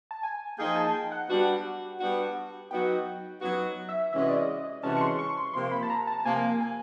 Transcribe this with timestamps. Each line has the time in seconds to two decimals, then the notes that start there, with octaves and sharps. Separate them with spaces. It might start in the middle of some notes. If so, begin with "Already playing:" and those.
0.11 A5
0.23 G#5
0.58 F3 A#3 D#4 G#4 G5
0.76 A5
0.93 G5
1.12 F#5
1.29 G3 B3 D4 F#4
2.00 G3 B3 D4 F#4
2.71 F#3 B3 D#4 F#4 G5
3.41 F#3 B3 D#4 F#4
3.89 E5
4.12 C3 E3 G#3 C#4 F#4 E5
4.22 D#5
4.29 D5
4.38 D#5
4.83 C3 E3 G#3 C#4 F#4 A5
4.97 C#6
5.01 C6
5.19 C#6
5.37 C6
5.54 C3 F3 A#3 C6
5.71 B5
5.83 A5
5.90 A#5
6.07 A5
6.20 A5
6.25 C3 F3 A#3 G#5
6.61 G#5